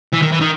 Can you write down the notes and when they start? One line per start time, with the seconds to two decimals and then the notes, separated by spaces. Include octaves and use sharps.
0.13 E3
0.22 D#3
0.32 E3
0.41 D#3